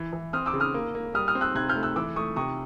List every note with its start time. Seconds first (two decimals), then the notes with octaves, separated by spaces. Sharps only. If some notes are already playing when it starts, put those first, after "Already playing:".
Already playing: E3
0.13 E3
0.33 C4 D#6 F6
0.46 D6 E6
0.53 C#3
0.60 D#6 F6
0.74 A#3
0.95 A#3
1.14 G3 D#6 F6
1.28 D#6 F6
1.35 C4
1.41 E6 F#6
1.55 C3 F#6 G#6
1.69 F6 G6
1.75 A3
1.83 E6 F#6
1.96 E3 D6 E6
2.16 A3 C#6 D#6
2.36 C3 C#6 D#6